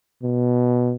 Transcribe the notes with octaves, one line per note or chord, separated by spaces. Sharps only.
B2